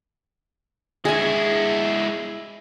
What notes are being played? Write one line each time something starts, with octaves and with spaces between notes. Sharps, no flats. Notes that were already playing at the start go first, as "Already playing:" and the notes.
G#3 E4 G#4 G#5